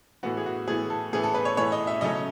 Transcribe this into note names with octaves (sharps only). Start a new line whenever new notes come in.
A2 E3 B3 F#4
G#4
F#4
A2 E3 B3 G#4
A4
A2 E3 B3 G#4
A4
B4
C#5
A2 E3 B3 C#5
D#5
E5
C#3 F#3 A3 C#4 D#5